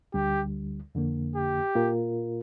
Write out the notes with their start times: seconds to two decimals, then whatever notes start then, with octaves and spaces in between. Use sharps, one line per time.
0.14 D2 D3 G3 G4
0.95 F2 D3 A#3
1.36 G4
1.75 A#2 A#3 F4 A#4